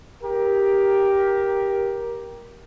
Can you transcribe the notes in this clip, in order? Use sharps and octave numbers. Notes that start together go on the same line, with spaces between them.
G4 A#4